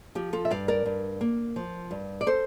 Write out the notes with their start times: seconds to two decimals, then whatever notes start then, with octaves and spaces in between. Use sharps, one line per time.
0.15 F3 G4
0.33 F4 A4
0.45 E5
0.51 G2 D5 F5
0.68 A#4 D5
0.85 G2
1.21 A#3
1.56 F3
1.91 G2
2.21 D5
2.27 A4 C5